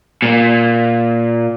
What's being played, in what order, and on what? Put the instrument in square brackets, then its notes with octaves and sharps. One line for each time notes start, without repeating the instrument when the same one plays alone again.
[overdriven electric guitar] A#2